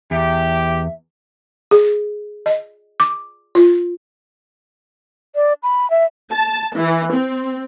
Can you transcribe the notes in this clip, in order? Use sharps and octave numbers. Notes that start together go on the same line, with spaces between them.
E2 G4 E5
G#4
D#5
D6
F4
D5
B5
E5
A5
E3
C4